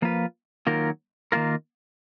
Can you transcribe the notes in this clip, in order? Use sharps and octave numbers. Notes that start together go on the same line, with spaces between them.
F3 A#3 F4 B4
D#3 F#3 A#3 F4 A#4
D#3 A#3 F4 A#4